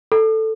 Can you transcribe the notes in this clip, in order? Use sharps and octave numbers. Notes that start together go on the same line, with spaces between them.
A4